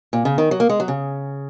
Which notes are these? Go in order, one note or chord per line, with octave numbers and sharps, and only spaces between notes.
A#2
C#3
D#3
F#3
A#3
G#3
F#3
C#3